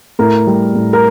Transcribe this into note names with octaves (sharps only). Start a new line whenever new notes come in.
A2 A#4
G3
A2
A#4